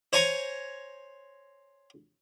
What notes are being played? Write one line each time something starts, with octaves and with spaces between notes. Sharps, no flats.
C5 C#5 G#5 A#5 C#6